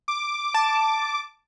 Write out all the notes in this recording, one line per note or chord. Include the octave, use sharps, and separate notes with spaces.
D6
A5